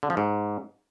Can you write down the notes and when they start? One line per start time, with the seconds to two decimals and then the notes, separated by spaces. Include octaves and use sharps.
0.03 D3
0.10 F3
0.17 G#2